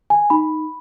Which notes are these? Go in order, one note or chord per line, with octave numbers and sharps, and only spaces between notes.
G#5
D#4 B5